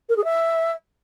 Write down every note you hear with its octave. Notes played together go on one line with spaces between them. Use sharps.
A#4
G#4
E5